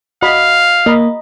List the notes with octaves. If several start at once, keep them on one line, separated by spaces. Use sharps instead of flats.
F#4 D#5 F5 B5
A#3 D#5 A#5 B5